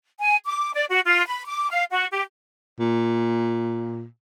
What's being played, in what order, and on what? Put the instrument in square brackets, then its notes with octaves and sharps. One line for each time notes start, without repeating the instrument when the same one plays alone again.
[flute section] G#5
D6
D5
F#4
F4
B5
D6
F5
F#4
G4
[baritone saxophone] A#2